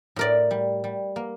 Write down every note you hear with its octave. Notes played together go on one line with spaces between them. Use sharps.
A2 A#4 D5
G3
G3
A#3